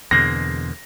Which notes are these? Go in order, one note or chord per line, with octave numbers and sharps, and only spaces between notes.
E2 B2 D3 G#3 A#3 C4 A#6